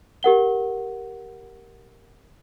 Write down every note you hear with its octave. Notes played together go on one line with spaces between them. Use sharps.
G4 A#4 F#5 G7